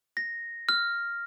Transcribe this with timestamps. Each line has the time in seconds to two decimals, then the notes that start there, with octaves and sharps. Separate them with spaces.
0.17 A#6
0.69 F6